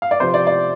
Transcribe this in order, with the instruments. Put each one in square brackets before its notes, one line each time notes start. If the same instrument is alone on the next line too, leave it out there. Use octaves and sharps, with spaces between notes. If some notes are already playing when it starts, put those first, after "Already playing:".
[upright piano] F5
D5
C3 F3 C5
D5
D5